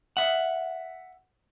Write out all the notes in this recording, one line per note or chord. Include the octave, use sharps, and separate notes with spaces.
E5 F#5